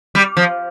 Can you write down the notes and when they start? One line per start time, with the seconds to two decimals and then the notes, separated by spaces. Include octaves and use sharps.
0.15 G3
0.37 F3